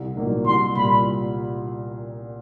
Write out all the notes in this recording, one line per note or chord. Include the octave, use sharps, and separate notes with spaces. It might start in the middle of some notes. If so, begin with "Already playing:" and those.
Already playing: C2
A#2 F#3 A#3 D#4
C2 C6
A#2 G3 B5